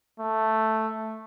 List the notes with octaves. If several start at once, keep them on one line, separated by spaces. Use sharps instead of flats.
A3